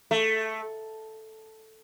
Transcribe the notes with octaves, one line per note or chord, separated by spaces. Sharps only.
A3